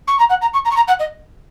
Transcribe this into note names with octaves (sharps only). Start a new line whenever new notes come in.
C#6
A#5
F#5
A#5
C#6
A#5
C#6
A#5
F#5
D#5